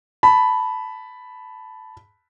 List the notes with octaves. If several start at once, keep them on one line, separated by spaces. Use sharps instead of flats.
A5 B5